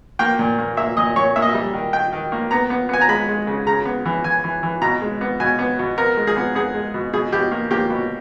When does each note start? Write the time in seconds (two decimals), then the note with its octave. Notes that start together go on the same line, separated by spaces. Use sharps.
0.19 A#3 G5
0.39 A#2
0.58 A#3
0.77 A#3 E5
0.97 A#2 D#5
1.16 A#2 C#5
1.36 A#3 E5
1.42 D#5
1.49 E5
1.54 G3
1.74 D#3
1.93 D#3 G5
2.13 D#3
2.32 A#3
2.51 B3 A#5
2.70 B3
2.89 B3 G#5
3.01 A#5
3.09 G#3 B5
3.28 G#3
3.47 C#3
3.67 C#3 A#5
3.85 B3
4.05 E3
4.24 E3 G#5
4.44 E3
4.63 E3
4.82 B2 A#5
5.02 G#3
5.21 B3
5.40 B2 G#5
5.59 B3
5.79 B2
5.98 B3 A#4
6.17 G#3
6.27 G#4
6.37 B3
6.55 B3 G#4
6.75 G#3
6.94 B2
7.14 B2 G#4
7.32 B2 G4
7.51 A#3
7.71 A#3 G4
7.90 B2